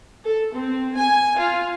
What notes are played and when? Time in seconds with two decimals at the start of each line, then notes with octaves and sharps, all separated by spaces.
0.23 A4
0.54 C4
0.96 G#5
1.38 F4